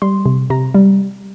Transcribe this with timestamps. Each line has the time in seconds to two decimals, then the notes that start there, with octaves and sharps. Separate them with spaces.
0.02 G3 C6
0.26 C3
0.50 C3 A#5
0.74 G3